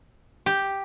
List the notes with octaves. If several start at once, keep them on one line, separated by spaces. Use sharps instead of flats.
G4